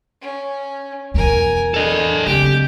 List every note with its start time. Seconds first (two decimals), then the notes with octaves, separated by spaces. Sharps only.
0.22 C#4
1.14 E2 B2 A#4 G#5
1.74 D4 G#4 A4 D#5
2.27 C#3 C4 G4 D6